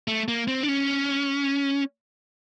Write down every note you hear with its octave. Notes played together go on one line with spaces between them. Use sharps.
A3
A#3
C4
D4
C#4